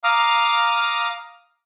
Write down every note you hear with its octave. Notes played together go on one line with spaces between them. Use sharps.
F5 A#5 D6 D#6 F6